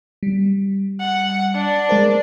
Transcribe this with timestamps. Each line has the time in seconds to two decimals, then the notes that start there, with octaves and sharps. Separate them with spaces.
0.23 G3
1.00 F#5
1.55 D4
1.89 G#3 A#4 C5